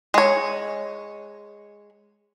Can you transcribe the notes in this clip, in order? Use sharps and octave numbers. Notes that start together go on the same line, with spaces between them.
G#3 C#5